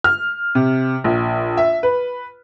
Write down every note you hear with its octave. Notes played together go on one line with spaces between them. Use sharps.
F6
C3
A#1
E5
B4